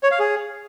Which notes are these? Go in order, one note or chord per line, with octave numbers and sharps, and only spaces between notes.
C#5
F5
G#4